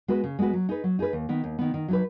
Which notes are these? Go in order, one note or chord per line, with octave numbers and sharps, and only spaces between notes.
G#3 B3 F#4 B4
C#3
G#3 B3 F#4 B4
F#3
D#4 G#4 B4
F#3
D#4 G#4 B4
D#2
D#3 B3
D#2
D#3 B3
D#3
F#3 D#4 B4